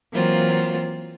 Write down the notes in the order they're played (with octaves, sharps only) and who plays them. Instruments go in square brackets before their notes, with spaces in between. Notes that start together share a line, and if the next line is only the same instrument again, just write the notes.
[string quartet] E3 F#3 A#3 C4 F4